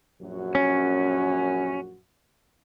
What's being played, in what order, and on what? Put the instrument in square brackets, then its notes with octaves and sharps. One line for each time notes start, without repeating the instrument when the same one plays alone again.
[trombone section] A#1 F#2 F#4
[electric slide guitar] C#4